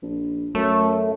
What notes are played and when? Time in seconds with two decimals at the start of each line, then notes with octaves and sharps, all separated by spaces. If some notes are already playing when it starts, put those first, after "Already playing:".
0.02 A#1
0.55 F#2 A3